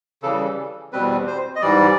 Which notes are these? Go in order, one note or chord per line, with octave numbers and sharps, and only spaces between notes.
C#3 E3 G3 A4
E2 B2 G3 C4 B4
C5
D#5
G#2 E3 G3 D5